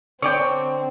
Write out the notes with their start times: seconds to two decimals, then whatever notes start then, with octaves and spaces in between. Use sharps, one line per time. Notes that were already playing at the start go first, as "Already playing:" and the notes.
0.22 D3 C4 C#5 D5 G5